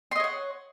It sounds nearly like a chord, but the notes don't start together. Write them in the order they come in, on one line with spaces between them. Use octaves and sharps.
C6 D#5 C#5 F#5